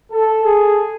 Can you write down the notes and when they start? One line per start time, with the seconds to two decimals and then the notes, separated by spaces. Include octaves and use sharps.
0.12 A4
0.45 G#4